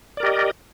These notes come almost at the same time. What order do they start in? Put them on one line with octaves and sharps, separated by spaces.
D5 A#4 G4 D#5